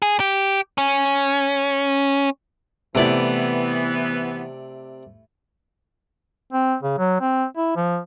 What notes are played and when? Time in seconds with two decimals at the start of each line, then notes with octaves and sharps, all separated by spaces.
0.02 G#4
0.20 G4
0.78 C#4
2.95 C3 E3 A3 B3 E4 D5
6.53 C4
6.83 C#3
6.98 F#3
7.21 C4
7.57 E4
7.76 F3